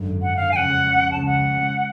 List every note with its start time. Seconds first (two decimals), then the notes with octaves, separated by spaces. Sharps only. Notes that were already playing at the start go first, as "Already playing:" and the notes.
Already playing: G#1 F#2 D3
0.22 F#5
0.37 F5
0.51 F2 C#3 G#3 C#4 F#5 G#5
1.11 C#2 C#3 G#3 C#4 A5
1.26 F#5